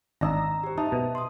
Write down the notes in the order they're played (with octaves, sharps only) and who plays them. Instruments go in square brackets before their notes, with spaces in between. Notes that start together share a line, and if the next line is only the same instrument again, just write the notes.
[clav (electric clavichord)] G#1 D4 D#5 [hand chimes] A#5 E6 A#6
[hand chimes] G4 C5
[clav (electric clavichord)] D#4 [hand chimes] D#5 E5 A5
[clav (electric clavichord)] B2
[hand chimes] C6 D#6